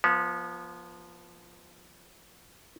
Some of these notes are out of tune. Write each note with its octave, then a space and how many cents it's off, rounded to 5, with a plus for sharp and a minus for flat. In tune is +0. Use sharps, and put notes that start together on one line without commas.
F3 +0 B3 -30